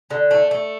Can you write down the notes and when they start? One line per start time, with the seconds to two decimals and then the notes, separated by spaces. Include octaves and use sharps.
0.10 D3
0.31 A3
0.51 A3